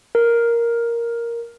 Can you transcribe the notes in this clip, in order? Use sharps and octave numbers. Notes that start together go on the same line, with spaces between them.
A#4